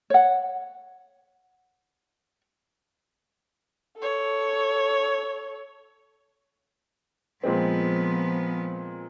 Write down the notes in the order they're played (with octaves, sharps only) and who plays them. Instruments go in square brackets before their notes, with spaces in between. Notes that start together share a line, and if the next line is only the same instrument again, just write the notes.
[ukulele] C#5 F#5
[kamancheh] A4 C#5
[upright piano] A#2 G#3 C4 [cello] F3 B3